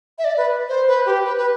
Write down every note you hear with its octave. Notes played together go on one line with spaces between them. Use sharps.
E5
D5
B4
C5
B4
G4
B4
B4